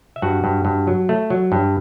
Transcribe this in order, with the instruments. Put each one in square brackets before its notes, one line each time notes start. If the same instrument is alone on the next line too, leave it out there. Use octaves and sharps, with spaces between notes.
[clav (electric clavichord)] E5
G2 F#4 F#5
G2
G2
F#3
A3
F#3
G2